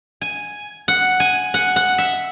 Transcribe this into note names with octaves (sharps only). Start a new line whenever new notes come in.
G#5
F#5
G#5
F#5
F#5
E5